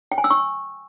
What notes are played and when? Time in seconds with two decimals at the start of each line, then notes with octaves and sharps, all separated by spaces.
0.12 G5
0.18 G#5
0.24 E6
0.30 C#6